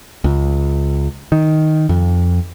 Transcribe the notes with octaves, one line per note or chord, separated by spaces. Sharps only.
C#2
D#3
F2